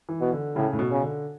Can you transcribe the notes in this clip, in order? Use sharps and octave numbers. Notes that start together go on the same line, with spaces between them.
E3
B2
D3
A2 C#3
A2
B2
C#3
D3